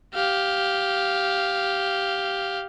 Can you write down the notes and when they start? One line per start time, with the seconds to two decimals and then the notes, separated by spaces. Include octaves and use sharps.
0.14 G4 F5